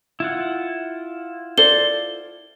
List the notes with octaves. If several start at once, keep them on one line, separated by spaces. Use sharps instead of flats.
E4 F4 F#5
A4 C5 D5 G7